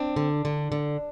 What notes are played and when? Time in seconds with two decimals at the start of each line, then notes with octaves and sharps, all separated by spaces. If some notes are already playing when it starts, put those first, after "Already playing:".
Already playing: C4 D4
0.16 D3
0.45 D3
0.72 D3